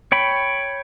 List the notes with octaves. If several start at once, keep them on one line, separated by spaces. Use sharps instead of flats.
C#5 G5 B5